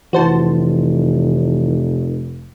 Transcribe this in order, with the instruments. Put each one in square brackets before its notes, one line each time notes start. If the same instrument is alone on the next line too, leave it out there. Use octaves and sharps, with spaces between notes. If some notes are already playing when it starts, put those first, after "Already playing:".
[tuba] F1 [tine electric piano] E3 [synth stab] F#4 C5 A5